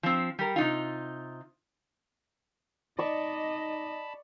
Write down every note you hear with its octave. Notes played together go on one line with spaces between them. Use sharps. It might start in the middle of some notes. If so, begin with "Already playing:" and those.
F3 C4
G3 A#4
C3 D#4 F4
D#4 D5 D#5 A5 B5 C#6